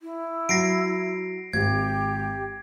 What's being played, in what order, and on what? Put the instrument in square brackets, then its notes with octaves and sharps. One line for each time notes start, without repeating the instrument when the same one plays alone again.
[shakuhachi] E4
[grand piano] F#3 [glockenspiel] A#6 C7 D7
[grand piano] G#1 [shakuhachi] G4 [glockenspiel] G#6